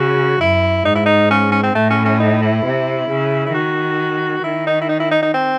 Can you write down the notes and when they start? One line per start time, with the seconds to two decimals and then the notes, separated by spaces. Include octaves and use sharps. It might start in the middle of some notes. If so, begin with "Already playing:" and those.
Already playing: C#3 F#4
0.41 F#2 E4
0.85 G#2 D#4
0.95 E4
1.06 D#4
1.30 C#4
1.52 C#4
1.63 C4
1.75 A2 A3
1.90 C#4
2.05 C#4
2.20 D#4
2.42 E4
2.65 C3
3.09 C#3
3.46 E4
3.54 D#3 F#4
4.44 D#3 E4
4.67 D#4
4.81 E4
4.89 D#4
5.00 E4
5.11 D#4
5.23 D#4
5.34 C4